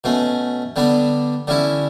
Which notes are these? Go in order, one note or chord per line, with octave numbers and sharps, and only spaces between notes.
B2 A3 C#4
D3 G3 B3 D4
D3 G3 C#4 E4